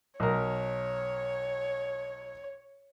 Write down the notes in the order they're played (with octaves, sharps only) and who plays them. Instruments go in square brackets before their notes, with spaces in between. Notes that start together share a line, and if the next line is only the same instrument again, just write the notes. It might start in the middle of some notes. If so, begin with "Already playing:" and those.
[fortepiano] B1 A#4 [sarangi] C#5